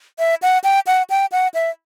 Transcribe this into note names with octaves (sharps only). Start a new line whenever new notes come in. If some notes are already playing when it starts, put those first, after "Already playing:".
E5
F#5
G5
F#5
G5
F#5
E5